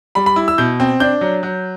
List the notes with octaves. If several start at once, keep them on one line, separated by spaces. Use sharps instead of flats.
G3 B5
B5
E4
E6
B2 G6
C4
D4 G6
F#3
F#3